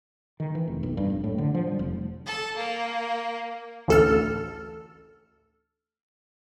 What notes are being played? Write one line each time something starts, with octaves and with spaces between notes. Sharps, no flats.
D#3
E3
F1
B1
G2
F1
A2
D3
F3
G3
F1
A4
A#3
A1 D2 A4 E6 F6